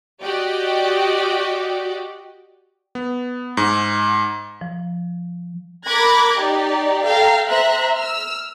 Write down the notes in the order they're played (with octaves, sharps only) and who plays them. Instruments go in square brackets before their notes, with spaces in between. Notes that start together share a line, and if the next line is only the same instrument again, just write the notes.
[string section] F#4 G4 D5 D#5 G5
[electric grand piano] B3
G#2
[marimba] F3
[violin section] A#4 B5 D6 F#6 G#6 A#6
D#4 G4 D5
A4 F5 G5 A#5
C5 E5 A#5 F#6
E6 F6